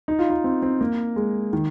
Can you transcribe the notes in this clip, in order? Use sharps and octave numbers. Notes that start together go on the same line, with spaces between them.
D#4
F4
D#4
C4
C4
A#3
G#3
D#3